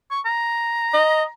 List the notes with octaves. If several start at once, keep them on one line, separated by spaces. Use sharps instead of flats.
C#6
A#5
D#5